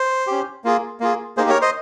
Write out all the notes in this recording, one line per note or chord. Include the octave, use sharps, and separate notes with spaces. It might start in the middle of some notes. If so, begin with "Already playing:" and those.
Already playing: C5
C#4 G4
A#3 F4 G#4
A#3 F4 G#4
A#3 D#4 G4 G#4 C5
A#4 C#5
C5 D#5